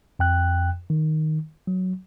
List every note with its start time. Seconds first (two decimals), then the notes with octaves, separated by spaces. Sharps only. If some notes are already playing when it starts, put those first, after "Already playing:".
0.19 F2 G5 F#6
0.90 D#3
1.67 F#3